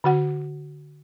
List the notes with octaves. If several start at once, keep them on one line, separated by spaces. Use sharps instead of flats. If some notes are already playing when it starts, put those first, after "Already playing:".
D3 F#4 F#5